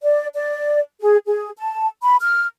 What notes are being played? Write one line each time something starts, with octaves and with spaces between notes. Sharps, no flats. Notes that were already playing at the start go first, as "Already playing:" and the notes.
D5
D5
G#4
G#4
A5
B5
F6